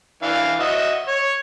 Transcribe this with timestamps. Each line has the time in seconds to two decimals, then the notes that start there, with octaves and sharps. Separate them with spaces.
0.23 E3 D4 F5
0.60 F#4 D#5 E5
1.08 C#5